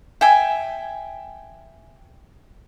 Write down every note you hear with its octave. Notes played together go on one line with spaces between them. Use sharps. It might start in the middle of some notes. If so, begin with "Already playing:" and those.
E5 G5 G#5